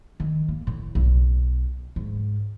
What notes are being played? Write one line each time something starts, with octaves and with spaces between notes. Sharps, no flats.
D#3
A#3
A2
B1
G#2